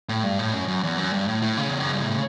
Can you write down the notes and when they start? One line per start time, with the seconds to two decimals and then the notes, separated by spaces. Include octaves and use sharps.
0.09 A2
0.23 G2
0.39 A2
0.53 F#2
0.68 F#2
0.83 E2
0.98 F#2
1.13 G2
1.28 A2
1.42 A2
1.57 C#3
1.69 E2
1.81 F#2
1.93 G2
2.04 A2